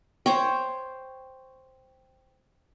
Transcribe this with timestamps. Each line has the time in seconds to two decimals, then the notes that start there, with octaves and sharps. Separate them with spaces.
0.26 C5 C#5 G5